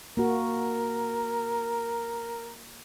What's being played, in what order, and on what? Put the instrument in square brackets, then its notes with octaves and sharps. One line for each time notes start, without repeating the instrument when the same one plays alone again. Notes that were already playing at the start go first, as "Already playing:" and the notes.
[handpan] A#3 F#4 [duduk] A#4